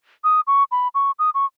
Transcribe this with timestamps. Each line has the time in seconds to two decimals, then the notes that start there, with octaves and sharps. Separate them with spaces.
0.24 D#6
0.47 C#6
0.71 B5
0.95 C#6
1.19 D#6
1.34 C#6